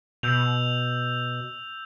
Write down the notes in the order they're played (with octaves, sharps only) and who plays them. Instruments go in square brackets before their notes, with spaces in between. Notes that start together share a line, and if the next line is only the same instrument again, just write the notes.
[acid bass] B2 [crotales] E6 G6 F7